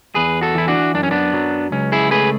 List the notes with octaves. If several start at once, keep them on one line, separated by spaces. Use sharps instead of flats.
E2 G#4 B4
F#4 A4
E3 E4
D4 F#4
F#2 D4
C#4
B3 D4
F#3
C#2 C#4
E4 G#4
A3 G#4 B4